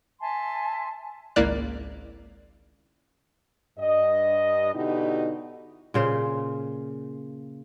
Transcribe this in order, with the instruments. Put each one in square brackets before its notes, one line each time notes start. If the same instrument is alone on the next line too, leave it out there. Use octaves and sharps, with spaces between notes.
[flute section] E5 G#5 A5 C6
[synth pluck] G#1 C#2 A#3 E4 D5 F#6
[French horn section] G2 D#5
B2 D3 D#4 E4 F#4 G4
[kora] A#2 C#3 C5